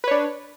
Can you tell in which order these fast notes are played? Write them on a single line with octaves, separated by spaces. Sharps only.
B4 C#5 D4